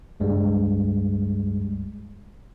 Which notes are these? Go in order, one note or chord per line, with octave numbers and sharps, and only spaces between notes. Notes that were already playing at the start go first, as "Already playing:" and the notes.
C#2 G2 G3 G#3